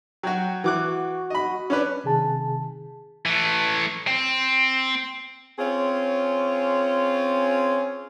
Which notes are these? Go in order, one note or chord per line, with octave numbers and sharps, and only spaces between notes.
F#3 F#4 G5
E3 F#4 D6 F#6
D#5 B5
C#4 D4 B4
C3 D#3 G#4 A5
E3 A3
C4
C4 C#4 F4 G#4 C#5